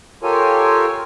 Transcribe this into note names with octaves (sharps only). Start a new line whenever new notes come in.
F4 G4 A4 A#4 C#5 G#5